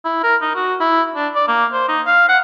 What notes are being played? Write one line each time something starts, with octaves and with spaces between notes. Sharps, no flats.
E4
A#4
D#4
F#4
E4
D4
D5
A#3
C5
D#4
F5
F#5